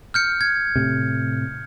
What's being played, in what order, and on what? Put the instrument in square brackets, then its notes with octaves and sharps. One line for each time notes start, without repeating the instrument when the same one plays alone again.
[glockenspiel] F6 G6 C#7
G#6
[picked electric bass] A2 C3